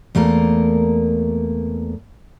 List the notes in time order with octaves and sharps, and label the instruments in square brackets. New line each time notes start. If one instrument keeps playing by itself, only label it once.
[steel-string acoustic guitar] E2 A3 A#3 A#4